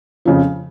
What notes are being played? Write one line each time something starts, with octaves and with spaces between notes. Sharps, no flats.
F2 C#3 F3